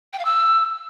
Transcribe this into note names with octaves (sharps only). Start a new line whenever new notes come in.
G5
F5
E6